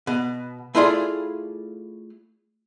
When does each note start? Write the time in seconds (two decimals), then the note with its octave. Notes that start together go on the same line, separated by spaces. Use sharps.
0.07 B2
0.75 A3 E4 F4 G#4 D5 C6